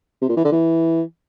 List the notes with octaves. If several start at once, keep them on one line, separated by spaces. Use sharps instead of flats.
C3
A#2
E3
D3
E3